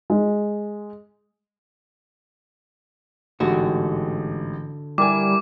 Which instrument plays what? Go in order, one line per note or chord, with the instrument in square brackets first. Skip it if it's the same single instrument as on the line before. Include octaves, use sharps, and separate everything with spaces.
[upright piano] G#3
[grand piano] A1 G#2 G4 [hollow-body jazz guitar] D3 F#4
[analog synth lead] G3 [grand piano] E4 A#4 G#5 [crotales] D6